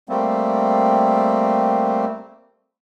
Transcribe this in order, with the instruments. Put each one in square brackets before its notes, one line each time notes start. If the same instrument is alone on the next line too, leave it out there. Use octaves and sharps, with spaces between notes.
[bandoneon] G3 A3 A#3 C4